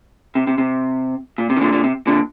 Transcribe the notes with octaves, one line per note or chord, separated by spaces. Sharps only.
C3
C3
C3
A#2
C3
D#3
A#2 D3
A#2 D3
C3
A#2 D3